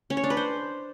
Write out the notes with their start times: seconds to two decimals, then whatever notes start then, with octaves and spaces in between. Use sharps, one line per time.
0.10 C#4
0.17 C#5
0.24 D4
0.30 B4
0.37 C5